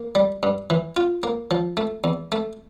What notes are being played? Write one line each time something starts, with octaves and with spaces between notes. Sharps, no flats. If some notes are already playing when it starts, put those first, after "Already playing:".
Already playing: A#3
G3
G2
E3
F4
A#3
F3
A3
E2
A3